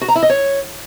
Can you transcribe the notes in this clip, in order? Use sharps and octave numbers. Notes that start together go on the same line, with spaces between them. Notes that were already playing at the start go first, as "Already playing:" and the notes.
F#4
A#5
E4
D#5
C#5